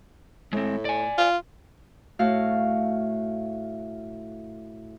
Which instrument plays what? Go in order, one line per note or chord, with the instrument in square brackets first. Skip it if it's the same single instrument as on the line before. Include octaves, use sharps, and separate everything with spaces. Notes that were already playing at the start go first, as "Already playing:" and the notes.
[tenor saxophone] A2 [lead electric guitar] G#3 C4
[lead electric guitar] D5 G#5
[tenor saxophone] F4
[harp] A2 A3 F#4 F5